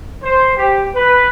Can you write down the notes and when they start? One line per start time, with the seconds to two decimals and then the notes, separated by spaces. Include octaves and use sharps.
0.23 C5
0.56 G4
0.94 B4